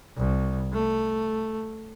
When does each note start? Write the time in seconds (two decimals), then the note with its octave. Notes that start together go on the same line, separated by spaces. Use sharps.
0.17 C2
0.73 A3